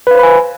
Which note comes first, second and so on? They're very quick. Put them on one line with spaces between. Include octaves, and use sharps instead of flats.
B4 F5 C5 B5 G#5